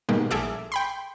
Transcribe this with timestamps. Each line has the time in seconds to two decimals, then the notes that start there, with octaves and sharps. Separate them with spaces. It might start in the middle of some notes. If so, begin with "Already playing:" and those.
0.09 G#2 B2 D#3 G3 A#3
0.31 A#1 G#4 A4 E5 D6 F6
0.72 G5 B5 C6